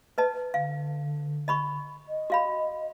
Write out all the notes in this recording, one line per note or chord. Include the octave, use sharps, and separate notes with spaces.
B4 D#5 A5
D3 F5
D#5 B5 C#6
D#5
F#4 F5 B5